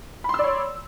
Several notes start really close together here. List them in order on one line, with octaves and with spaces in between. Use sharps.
B5 C6 E6 D5 C#5